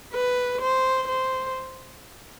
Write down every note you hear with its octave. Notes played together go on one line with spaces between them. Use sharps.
B4
C5
C5